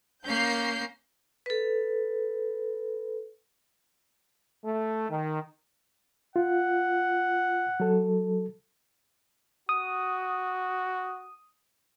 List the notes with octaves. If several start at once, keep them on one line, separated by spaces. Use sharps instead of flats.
A#3 C#4 G6 C7
A4 B4
A3
D#3
F4 F#5
F#3 A4
F#4 D#6